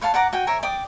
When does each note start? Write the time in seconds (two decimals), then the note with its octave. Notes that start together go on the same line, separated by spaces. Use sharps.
0.01 B4 C#5 F5 A5
0.14 D5 F#5 A#5 D6
0.33 F#4 G5 G#5
0.47 A#4 C#5 E5 G#5
0.63 D5 G5 D6 D#6